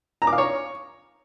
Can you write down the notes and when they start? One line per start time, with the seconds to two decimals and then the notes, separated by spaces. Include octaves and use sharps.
0.22 A#5
0.27 D6
0.33 F5
0.38 C#5